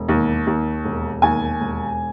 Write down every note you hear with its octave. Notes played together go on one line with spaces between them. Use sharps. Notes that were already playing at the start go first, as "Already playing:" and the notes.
Already playing: E1
D#2
D#2
E1
D#2 G#5
E1